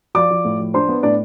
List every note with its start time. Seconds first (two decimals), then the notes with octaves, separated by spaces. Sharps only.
0.15 F3 D5 D6
0.30 F3
0.45 A2
0.59 F3
0.74 D4 C5 C6
0.89 B3
1.03 A2 D4 D5